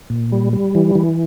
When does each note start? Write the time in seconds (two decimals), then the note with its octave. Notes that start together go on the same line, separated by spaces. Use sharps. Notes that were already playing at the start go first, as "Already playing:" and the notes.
0.10 A#2
0.32 G3
0.53 G3
0.75 E3
0.95 E3